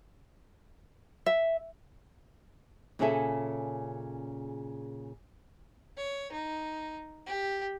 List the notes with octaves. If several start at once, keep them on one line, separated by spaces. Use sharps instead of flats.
E5
A#2 C#3 C#4 G#4 A4 E5
C#5
D#4
G4